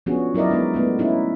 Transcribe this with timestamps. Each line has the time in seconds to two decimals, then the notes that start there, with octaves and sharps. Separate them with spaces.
0.06 F3 B3 C#4 D4 F#4 G#4
0.34 F#3 E4 A#4 D5 D#5
0.50 G#3 B3 D4 D#4
0.74 G#3 A3 B3
0.99 C#4 D#4 E4